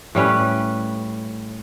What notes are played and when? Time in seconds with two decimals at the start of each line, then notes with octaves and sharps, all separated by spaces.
0.15 A2 G3 C#4 B4